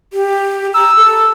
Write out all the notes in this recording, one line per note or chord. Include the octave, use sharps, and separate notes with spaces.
G4
A#5 E6
A4